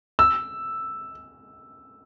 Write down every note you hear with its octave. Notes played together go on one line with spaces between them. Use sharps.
E6